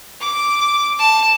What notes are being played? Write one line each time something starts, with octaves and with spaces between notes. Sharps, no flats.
D6
A5